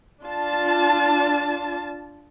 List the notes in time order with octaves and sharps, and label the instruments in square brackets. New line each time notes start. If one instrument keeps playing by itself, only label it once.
[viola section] D4 F4 A5